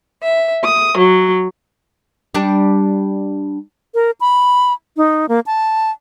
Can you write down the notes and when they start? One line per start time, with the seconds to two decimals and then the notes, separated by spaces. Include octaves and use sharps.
0.22 E5
0.63 D#6
0.97 F#3
2.35 G3 D4
3.94 A#4
4.21 B5
4.97 D#4
5.29 A#3
5.46 A5